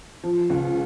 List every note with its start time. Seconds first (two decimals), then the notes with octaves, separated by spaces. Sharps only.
0.24 F3
0.50 C#2